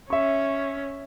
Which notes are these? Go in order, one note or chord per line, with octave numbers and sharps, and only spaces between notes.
C#4 E5 C#6